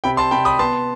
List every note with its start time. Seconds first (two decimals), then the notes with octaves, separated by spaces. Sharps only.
0.04 C3 G5 B5
0.17 A5 C6
0.31 C3 G5 B5
0.45 B5 D#6
0.59 B3 A5 C6